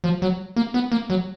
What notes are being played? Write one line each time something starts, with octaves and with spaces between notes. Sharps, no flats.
F3
F#3
A#3
B3
A#3
F#3